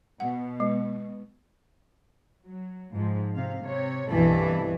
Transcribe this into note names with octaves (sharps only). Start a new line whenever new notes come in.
B2 F#5
G#3
F#3
G#2 F3 G#3
C3 F5
C3 C#5
C2 G2 B2 E3 A4